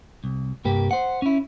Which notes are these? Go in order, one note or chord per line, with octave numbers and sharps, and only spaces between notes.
C2
C2 G2 A#3 G4 B4
C5 F#5
C#4 E4